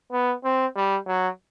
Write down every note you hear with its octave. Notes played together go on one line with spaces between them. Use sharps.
B3
C4
G3
F#3